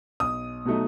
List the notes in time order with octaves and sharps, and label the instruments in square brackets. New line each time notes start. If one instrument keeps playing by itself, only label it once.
[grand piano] B1 D#6
B2 F#3 A3 D#4